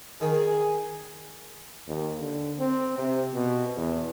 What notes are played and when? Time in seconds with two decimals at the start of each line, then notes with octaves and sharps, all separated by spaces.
0.21 D#3 G#4
1.88 D#2
2.19 D3
2.59 C4
2.98 C3
3.34 B2
3.77 E2